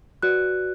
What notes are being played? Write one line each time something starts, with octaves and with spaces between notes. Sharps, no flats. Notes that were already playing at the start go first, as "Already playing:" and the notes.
F#4 B4 D5 F#6